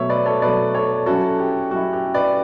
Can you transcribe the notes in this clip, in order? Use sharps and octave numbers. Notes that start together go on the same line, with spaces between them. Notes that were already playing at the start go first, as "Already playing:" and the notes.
Already playing: B2 F#3 A3 C#5 E5
B4 D5
A4 C#5
B2 F#3 A3 B4 D5
A4 C#5
F#3 C#4 E4 F#4 A4
G4
F#3 C#4 E4 F#4
G4
B4 D5